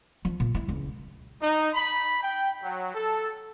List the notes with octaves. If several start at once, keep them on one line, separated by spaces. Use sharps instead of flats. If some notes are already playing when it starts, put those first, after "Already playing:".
F3
A#2
E4
C#2
D#4
B5
G5
F#3
A4